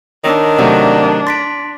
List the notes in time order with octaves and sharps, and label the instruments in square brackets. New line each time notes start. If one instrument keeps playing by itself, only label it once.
[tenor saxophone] D#3 [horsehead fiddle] D4 [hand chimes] C#5 E6 A#6
[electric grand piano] C3 F#3 A3 [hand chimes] D5 F#5 A5
[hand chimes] C6 B6 D7 [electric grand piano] A6